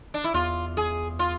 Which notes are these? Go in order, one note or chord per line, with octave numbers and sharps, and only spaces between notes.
D4
E4
E2 F4
G#4
F4